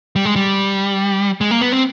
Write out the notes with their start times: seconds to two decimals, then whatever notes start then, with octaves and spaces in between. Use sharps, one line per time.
0.16 G3
0.25 G#3
0.36 G3
1.41 G#3
1.51 A#3
1.61 B3
1.72 C4